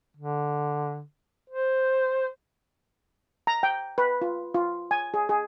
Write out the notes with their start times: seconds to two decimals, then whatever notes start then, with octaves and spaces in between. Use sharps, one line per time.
0.16 D3
1.50 C5
3.47 A#5
3.63 G5
3.98 B4
4.21 F4
4.54 F4
4.91 G#5
5.14 G#4
5.29 G#4